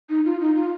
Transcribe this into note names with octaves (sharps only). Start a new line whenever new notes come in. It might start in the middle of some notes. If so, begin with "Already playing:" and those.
D#4
F4
D#4
F4